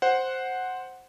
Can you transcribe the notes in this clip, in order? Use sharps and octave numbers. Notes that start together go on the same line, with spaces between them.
C5 F#5